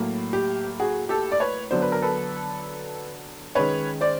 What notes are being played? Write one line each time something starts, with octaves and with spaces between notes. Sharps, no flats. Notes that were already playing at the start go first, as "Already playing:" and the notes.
Already playing: A2 F#3 A#3
G4
F#4 G#4
G4 A4
D5
B4 C#5
D3 F#3 B3 D4 C5
B4
A#4
A4 B4
D#3 G#3 C#4 B4 C#5
C5 D5